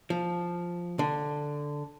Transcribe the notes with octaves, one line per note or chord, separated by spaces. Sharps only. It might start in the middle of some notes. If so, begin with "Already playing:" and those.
F3
D3